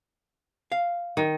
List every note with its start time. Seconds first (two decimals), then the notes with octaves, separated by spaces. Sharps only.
0.72 F5
1.17 D#3